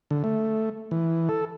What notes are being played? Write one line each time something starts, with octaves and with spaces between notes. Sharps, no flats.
D3
A3
E3
A4